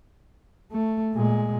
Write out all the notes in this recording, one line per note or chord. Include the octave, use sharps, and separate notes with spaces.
A3
A#2 G#3